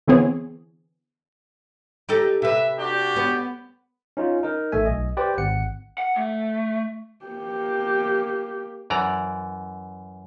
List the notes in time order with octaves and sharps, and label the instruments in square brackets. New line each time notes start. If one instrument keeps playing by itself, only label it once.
[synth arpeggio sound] D3 E3 B3 C4 G#4 C#5
[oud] D#4 G4 A4
[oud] C3 B4 [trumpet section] E5
[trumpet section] D4 F#4 G4
[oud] B3
[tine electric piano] C#4 D#4 F4
D#4 A#4
A1 A3 E5 G#5
B1 D#5
G4 B4 C5 D5 G5
G#1 F#5 C#7
[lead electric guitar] F#5
A3
[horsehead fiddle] A#3 G4
[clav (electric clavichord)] F#2 E3 D5 A#5